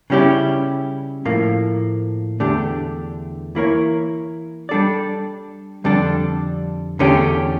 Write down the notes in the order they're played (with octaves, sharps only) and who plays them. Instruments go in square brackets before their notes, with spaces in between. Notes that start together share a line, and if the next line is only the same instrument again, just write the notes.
[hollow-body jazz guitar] C#3 G3 C#4 E4 G4
A2 F3 A#3
E2 D3 A3 D4 G4
E3 A#3 E4 A#4 C#5
G3 D4 A4 D5
F2 D3 G3 D4 A4
E2 D3 A3 C#4 G4